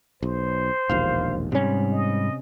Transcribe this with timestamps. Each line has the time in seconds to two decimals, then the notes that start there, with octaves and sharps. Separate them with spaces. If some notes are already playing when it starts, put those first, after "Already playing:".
0.23 B1 C5
0.90 E1 A#1 D#2 F5
1.52 G#2 C3 G3 C#4
1.93 D#5